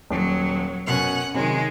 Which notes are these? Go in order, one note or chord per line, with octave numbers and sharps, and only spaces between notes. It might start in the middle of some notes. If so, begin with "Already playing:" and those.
D#1 F#3
F#2 B2 C#4 F#5
C3 D#3 F#3 G#3 C#4